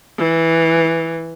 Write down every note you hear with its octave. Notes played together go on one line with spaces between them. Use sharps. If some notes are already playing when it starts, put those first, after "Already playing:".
E3